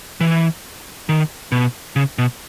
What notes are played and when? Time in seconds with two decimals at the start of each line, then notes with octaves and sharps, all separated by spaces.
0.21 E3
1.09 D#3
1.52 B2
1.96 C#3
2.18 B2